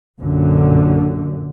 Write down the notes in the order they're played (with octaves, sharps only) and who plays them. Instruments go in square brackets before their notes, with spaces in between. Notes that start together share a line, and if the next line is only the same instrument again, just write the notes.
[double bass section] A#1 F#2 D3